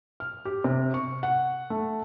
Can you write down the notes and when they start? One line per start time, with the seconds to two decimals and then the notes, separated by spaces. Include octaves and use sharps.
0.20 F6
0.45 G4
0.64 C3
0.94 C#6
1.23 F#5
1.70 A3